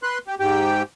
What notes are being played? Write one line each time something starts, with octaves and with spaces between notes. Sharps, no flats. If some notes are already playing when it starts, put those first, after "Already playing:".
B4 C6 F#6
G4
G#2 G4 G5